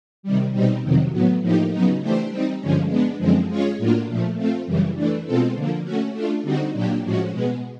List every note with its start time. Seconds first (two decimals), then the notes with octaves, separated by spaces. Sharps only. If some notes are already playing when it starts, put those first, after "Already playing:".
0.23 C3 D#3 G3
0.53 B2 G3 C4 D#4
0.83 F2 C3 D#3 F#3
1.12 A2 F#3 B3
1.42 A2 F3 A#3 D#4 G4
1.71 C#3 F#3 B3 D#4
2.00 E3 A3 D4 G4 C5
2.30 G3 C4 D#4
2.59 G2 D3 F3 G#3 C#4
2.89 G#3 B3 D4
3.19 F#2 D3 F3 G#3 C4
3.49 G#3 C#4 F4 G#4 C#5
3.78 A2 F#3 A#3 D4 F4
4.08 A#2 F3 A3
4.37 A3 C4 F4
4.66 F#2 C#3 E3 G3
4.95 E3 A3 D4
5.25 B2 G#3 C4 F4 A4
5.54 D3 F3 A#3
5.84 A3 C#4 F#4
6.13 A3 D4 F4
6.43 D3 G3 C4 D#4 F#4
6.73 A#2 F#3 A#3 D4 G4
7.03 A2 F3 G#3 C#4 F#4
7.31 B2 G#3 B3